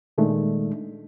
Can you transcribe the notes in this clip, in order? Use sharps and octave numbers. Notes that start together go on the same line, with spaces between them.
A#2 D#3 G#3 A3 D4 D#4